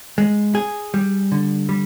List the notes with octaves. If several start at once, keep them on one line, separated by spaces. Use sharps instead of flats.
G#3
G#4
G3
D3
G3